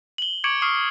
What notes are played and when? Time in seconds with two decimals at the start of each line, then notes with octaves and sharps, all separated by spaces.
0.18 F#7 G7
0.44 C#6 D6 G#6 C#7 D7 F#7
0.62 C#6 D#6 F6 C7